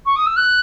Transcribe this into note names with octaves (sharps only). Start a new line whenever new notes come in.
C#6
D#6
E6
F#6